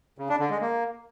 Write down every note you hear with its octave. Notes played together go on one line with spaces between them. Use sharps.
C#3
D4
D3
G#3
A#3